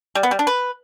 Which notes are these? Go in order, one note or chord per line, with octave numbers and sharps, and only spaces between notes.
G3
B3
G3
D4
B4